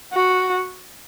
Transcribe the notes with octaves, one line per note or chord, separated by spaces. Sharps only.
F#4